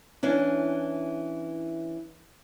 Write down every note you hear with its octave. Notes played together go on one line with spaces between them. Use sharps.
E3 C#4 D4